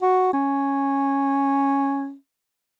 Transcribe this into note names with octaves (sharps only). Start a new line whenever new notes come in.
F#4
C#4